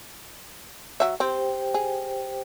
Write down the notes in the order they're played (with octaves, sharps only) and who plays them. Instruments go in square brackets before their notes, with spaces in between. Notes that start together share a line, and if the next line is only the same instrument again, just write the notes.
[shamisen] F#3 E5
[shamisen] C4 [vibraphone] G4 C5 G5
[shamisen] G#4